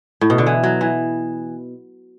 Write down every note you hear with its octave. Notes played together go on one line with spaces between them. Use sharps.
A2
B2
D3
E3
F#3
E3